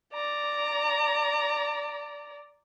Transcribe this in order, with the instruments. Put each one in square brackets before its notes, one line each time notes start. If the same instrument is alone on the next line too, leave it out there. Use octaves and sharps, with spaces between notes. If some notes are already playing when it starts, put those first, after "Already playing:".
[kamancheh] D5 A#5